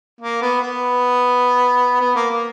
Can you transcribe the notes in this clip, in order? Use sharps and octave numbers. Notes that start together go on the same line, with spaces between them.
A#3
B3
B3
B3
A#3
A#3